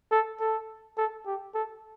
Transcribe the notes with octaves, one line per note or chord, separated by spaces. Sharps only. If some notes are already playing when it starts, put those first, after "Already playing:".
A4
A4
A4
G4
A4